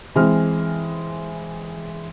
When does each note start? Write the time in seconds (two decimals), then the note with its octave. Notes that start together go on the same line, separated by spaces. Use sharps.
0.16 E3 G#3 C4 F6